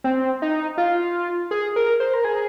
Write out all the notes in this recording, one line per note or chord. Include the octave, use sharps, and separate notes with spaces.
C4
D#4
F4
G#4
A#4
C5
A#4
G#4